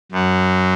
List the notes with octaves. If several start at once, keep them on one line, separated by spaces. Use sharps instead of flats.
F#2 F#3